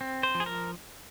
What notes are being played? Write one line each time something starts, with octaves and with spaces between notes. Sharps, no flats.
C4
C5
F3
G#4
A#4